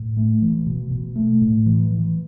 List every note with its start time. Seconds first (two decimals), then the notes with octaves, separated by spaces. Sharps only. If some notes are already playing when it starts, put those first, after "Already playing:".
Already playing: A2
0.17 A3
0.42 E3
0.67 B2
0.91 B2
1.16 A3
1.41 A2
1.66 E3
1.90 E3